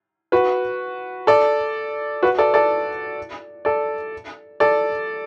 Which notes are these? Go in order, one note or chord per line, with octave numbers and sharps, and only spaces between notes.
F#4 B4
A4 D5
F#4 B4
A4 D5
A4 D5
A4 D5
A4 D5